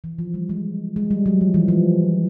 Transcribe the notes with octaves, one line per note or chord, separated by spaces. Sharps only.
E3
F3
G3
G#3
G#3
G3
F#3
F3
E3
F3